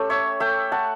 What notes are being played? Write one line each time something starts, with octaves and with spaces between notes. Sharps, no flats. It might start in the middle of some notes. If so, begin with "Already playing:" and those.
Already playing: A3 C#4 G4 A4
C#5 E5
A3 E5 G5
F#5 A5